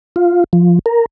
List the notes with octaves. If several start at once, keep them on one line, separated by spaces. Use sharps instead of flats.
F4
F3
A#4